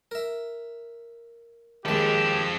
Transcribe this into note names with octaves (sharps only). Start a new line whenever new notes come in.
A#4 E5
D#2 F3 G#3 G4 A4 B5